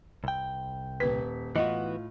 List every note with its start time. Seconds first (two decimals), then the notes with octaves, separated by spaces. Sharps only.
0.24 C2 G5
1.00 D#1 B4 B6
1.56 A2 E3 B3 F4 F#4 D#5